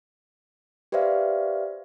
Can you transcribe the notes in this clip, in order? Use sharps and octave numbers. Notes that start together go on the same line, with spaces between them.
G4 B4 C5 D5 E5 F5